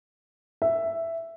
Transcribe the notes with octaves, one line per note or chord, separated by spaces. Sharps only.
E5